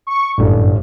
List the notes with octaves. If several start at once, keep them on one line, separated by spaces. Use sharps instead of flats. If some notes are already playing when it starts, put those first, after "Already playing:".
C#6
G1 F#2 A2 D3